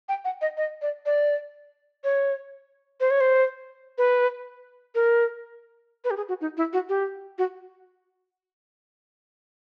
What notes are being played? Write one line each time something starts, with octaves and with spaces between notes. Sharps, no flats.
G5
F#5
D#5
D#5
D5
D5
C#5
C5
C#5
C5
B4
A#4
B4
G4
G#4
F#4
D#4
E4
F#4
G4
F#4